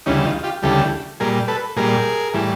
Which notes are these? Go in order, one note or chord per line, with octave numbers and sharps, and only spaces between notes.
D2 C#3 E3 G3 C#4 D#4
D#4 F4
F4 G4
D2 C#3 E3 G3 G4 A4
A#2 G3 G#4 A#4
A4 B4
A#2 G3 G#4 A#4
A2 E3 G3